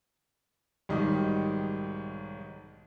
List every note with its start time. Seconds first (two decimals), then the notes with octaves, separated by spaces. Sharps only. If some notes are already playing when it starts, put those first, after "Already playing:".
0.89 B1 G#2 D#3 G3 D#4 G4